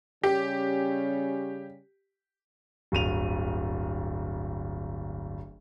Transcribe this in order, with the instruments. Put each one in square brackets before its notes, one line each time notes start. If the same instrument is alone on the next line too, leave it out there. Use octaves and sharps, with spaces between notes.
[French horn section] C#3 G3 C#4 [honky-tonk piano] G4
[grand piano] D1 G1 D#7 F7